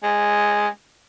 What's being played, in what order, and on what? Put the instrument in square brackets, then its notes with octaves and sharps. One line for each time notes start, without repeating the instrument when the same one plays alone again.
[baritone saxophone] G#3